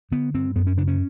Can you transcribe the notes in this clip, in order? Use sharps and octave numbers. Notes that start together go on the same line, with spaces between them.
D3 B3
G2 C4
F#2 B3
C#4
C#3 D4
C#4